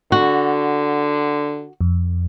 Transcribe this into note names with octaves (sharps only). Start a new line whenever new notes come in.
D3 F#4
F2